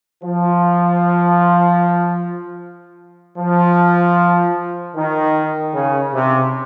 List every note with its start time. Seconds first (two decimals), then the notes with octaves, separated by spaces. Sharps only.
0.24 F3
3.38 F3
4.96 D#3
5.74 C#3
6.14 C3